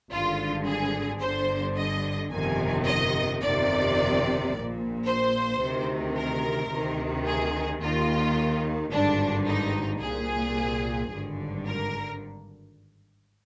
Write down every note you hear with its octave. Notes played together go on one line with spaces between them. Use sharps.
G#1 G2 D3 F4
G#4
G1 G2 D3 C5
D#5
G1 F2 C3 D#3 G#5
D#5
G1 F2 C3 D#3 D5
A#1
A#2
C5
D2 C3 D#3
A#4
D2 C3 D#3
G#4
D#2 D#3 F4
G#1 G2 D3 D4
D#4
C2 G#4
A#2
G#1 G2 D3
A#4